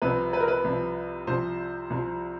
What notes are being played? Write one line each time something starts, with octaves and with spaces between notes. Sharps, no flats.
C2 C3 F3 B4
B4
A#4
B4
C2 C3 F3
C2 C3 F3 C5
C2 C3 F3